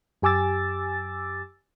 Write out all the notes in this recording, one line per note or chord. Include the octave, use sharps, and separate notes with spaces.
F#2 G4 G#5 D6 E6 A6